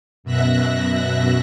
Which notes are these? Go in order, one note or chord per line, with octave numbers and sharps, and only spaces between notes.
F#2 B2 E5 F#6 A#6